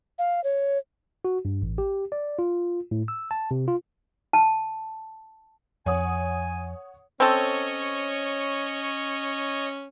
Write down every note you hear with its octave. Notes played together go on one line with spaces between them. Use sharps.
F5
C#5
F#4
G2
A1
G4
D5
F4
A2
E6
A5
C3
F4
A5
F2 C#5 F#5 G#5 D#6
C4 C#4 A4 C#5 D#5 C#7